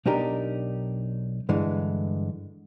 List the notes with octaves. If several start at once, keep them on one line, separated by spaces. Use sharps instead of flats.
B1 D4 D#4 G4 A#4
G2 D3 E3 G#3